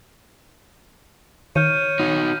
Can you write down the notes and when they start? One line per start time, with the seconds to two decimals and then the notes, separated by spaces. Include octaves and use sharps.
1.56 D#3 C#5 F6 G6 D#7
2.00 D#4 F#4